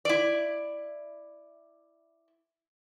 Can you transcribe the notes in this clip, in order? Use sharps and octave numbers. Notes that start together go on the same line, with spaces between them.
E4 D5